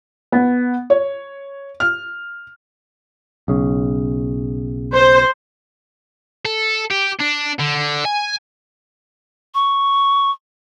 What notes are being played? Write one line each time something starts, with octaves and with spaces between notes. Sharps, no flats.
B3
C#5
F6
B1 C#3
C5
A4
G4
D4
D3
G#5
C#6